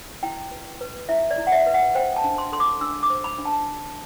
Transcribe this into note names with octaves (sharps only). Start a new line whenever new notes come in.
E4 G5
B4
B4
E4 E5
D5
E4
F#5
E5
B4
F#5
C5 G5
A5
D4
C6
A4 C6
D6
D4 E6
D6
C5
B5
D4
A5